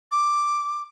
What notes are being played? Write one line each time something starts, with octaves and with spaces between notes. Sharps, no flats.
D6